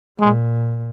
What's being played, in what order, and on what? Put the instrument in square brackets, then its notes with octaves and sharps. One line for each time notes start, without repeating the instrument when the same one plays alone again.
[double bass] A#2 [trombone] G#3